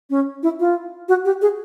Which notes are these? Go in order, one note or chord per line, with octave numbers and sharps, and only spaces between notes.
C#4
E4
F4
F#4
G4
G#4